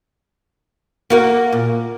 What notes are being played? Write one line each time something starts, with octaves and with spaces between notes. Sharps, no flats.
A#3 F#4 A#4
A#2